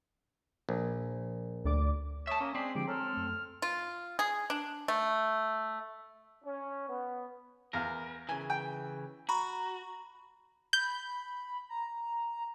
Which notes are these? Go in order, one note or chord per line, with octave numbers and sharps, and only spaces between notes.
A#1
D2 D5 D6
C#5 E5 A5 D#6
A#3 C#4
G#3 C4 D5 D6 B6 C7
D3 F3 G#3 G4 D7
A4 C#5 G#5 A#5 F6
F#2 A3
F4
G#4
D4
A3
C#4
B3
E2 A#4 F5
C#3 E3 G#5
G5
F#4 A#5 B5 C#6
B5 G6
A#5